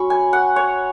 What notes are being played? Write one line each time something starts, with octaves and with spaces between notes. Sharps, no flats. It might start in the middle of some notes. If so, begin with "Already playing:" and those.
Already playing: F#3 C#4 B5 C#6
G#5
F#5
C#5